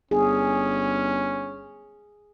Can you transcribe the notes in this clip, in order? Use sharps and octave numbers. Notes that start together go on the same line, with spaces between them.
G1 C#4 G#4